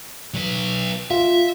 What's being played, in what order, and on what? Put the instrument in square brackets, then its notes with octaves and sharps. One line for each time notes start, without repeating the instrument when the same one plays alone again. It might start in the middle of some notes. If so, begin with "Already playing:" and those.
[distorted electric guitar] F#3 B4
[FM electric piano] F4 [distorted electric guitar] E5